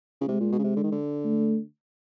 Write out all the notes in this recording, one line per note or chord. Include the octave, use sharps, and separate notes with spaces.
C#3
C3 G#3
A#2
B2
C#3
C3
D3
D#3
D3
A3